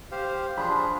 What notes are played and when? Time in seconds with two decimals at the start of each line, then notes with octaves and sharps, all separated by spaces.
0.12 G4 C5 F5
0.58 F3 D4 G#4 B5 C6